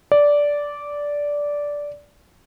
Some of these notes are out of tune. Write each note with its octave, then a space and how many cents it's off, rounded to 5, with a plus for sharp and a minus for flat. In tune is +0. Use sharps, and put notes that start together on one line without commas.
D5 -10